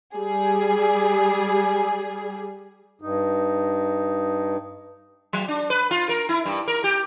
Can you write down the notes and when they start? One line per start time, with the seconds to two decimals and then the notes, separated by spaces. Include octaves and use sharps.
0.15 G3 G#4
3.02 G2 D#4
5.33 F#3
5.48 D4
5.70 B4
5.91 F4
6.09 A#4
6.29 E4
6.45 G2
6.68 A#4
6.84 G4